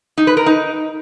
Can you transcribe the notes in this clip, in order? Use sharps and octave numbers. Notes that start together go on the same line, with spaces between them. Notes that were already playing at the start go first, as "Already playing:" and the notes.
D#4
B4
A#4
D#4